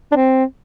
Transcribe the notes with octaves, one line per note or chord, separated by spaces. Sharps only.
D4
C4